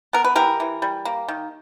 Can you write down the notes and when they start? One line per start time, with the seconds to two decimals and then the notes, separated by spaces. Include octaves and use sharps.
0.13 B3 A#4
0.24 B4
0.36 E3 G4 A#4
0.60 E3
0.82 G3
1.05 A#3
1.28 D#3